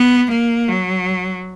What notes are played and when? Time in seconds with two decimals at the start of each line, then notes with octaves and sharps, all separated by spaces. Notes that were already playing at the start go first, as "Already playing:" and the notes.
Already playing: B3
0.31 A#3
0.68 F#3